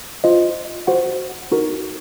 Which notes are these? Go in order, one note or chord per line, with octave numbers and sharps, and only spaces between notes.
F4 C5 D#5
F#4 C5 F#5
D#4 F#4 A#4